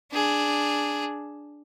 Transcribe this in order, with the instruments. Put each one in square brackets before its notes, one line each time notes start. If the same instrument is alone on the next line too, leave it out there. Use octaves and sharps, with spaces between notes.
[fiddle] D4 G#4